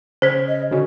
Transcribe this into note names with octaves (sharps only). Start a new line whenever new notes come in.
C#3 C5 F6 G#6 B6
D#5
D3 C#4 F#4